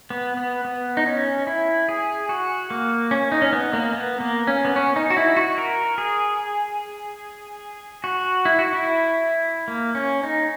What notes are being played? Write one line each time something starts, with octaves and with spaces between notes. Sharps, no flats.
B3
B3
B3
D#4
C#4
E4
G#4
F#4
A#3
C#4
D#4
C#4
B3
A#3
B3
A#3
C#4
B3
C#4
D#4
F#4
E4
F#4
A#4
G#4
F#4
E4
F#4
E4
A#3
C#4
D#4